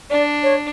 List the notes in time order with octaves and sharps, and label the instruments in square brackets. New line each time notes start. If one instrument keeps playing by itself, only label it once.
[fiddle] D4 [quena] D5
[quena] C#5